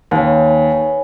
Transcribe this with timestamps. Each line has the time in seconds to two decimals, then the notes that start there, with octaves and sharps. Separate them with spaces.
0.11 D#2 C#4 B4